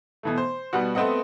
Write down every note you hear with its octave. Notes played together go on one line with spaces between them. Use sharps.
B2 E3 A3
C5
B2 G3 B3 F#4
A3 B3 C4 B4 D#5 F#5